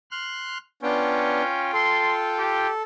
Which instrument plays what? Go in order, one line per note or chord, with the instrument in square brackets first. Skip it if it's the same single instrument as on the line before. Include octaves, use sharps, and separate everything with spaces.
[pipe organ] C6 F6 F#6
[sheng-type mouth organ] B3 D4 [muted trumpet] C#4 [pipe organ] F4 G5
[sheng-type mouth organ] A4 [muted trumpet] C6
[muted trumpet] G4